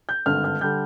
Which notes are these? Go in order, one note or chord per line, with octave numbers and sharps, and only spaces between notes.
G6
G#1 G2 D3 F6
F6
D3 G3 G6